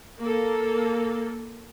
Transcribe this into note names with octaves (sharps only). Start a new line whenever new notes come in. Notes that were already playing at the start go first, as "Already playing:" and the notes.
A#3 A4